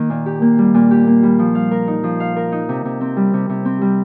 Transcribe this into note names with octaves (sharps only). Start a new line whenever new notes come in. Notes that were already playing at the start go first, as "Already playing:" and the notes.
Already playing: D#3 A#3
A#2
G4
A#3
G3
A#2
G4
A#3
G3
F3
F5
A#4
D#4
F3
F5
A#4
D#4
C3
C3
C4
G3
C3
C3
C4
G3